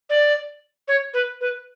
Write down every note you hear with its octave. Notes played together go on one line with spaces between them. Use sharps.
D5
C#5
B4
B4